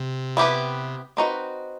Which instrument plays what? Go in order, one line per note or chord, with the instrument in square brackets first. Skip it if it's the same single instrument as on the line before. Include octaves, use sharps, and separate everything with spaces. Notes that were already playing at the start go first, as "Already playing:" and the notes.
Already playing: [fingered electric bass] C3
[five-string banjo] B3 E4 G4 B4
C4 D#4 F#4 B4